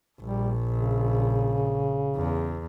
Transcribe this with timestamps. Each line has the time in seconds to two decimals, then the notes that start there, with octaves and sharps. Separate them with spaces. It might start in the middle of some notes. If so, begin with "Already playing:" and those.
0.20 A#1 G3
0.71 C#3
2.16 E2